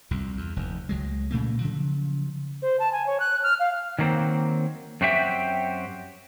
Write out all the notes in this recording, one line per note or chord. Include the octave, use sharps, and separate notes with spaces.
C2 F2
E2
F1 D#2
C#2 F#3 G#3
A#2 C#3 A3 A#3
C#3 F3 F#3
C5
A5
G#5
C#5
F#6
F6
F5
D#3 F#3 A#3 C4
F#2 C4 F#4 G4 E5 G5